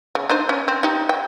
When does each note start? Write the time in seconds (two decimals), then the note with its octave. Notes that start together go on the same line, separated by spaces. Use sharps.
0.15 C#3
0.30 D4 D#4 C5
0.49 C#4
0.68 C4
0.83 D#4 G4
1.09 G5